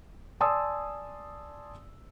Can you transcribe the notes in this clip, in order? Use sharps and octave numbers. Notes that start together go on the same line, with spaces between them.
D5 G#5 A5 C6 D#6 E6